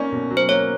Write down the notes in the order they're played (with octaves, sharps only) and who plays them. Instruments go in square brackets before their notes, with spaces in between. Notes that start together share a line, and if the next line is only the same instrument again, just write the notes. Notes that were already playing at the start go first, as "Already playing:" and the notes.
Already playing: [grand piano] A#3 C#4 [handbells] D5
[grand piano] B2
F#3
[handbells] C5
[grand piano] A#3 [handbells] C#5